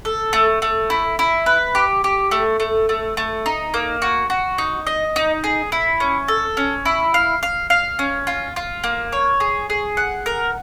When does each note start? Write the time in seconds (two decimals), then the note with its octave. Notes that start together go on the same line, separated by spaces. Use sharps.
0.05 A4
0.33 A3
0.62 A3
0.90 E4
1.19 E4
1.46 B4
1.75 G4
2.04 G4
2.31 A3
2.60 A3
2.89 A3
3.17 A3
3.46 D#4
3.74 A#3
4.02 F#4
4.30 F#4
4.58 D#4
4.87 D#5
5.16 D#4
5.44 G#4
5.72 E4
6.00 C#4
6.28 A4
6.57 C#4
6.85 E4
7.14 F5
7.43 F5
7.70 F5
7.99 C#4
8.27 F4
8.56 F4
8.84 A#3
9.12 C#5
9.40 G#4
9.70 G#4
9.97 F#5
10.26 A#4